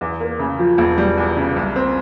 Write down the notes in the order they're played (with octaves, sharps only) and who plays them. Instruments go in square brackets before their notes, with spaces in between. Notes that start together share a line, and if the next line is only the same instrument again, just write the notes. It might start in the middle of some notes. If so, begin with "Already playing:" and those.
[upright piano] E2
A#3
C#3
F3
E1
G3
E2
C#3
C2
C4